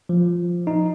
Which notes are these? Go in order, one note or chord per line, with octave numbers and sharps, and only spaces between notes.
F3
D#4